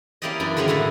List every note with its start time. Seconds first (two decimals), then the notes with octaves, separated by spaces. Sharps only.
0.22 A#3 C#4 E4 G4 D5 D#5
0.40 F#2 E3 D4
0.57 D3 D#3 G#3 B3 C#4
0.68 F#2 A2 D3 A3 E4